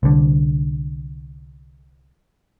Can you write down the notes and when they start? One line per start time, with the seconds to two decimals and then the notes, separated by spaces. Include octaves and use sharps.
0.03 C2 D3